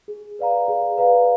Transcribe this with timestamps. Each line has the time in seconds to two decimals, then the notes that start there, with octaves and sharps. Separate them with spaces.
0.08 G#4
0.39 B4 D5 F5 A#5
0.68 G#4
0.98 B4 D5 F5 A#5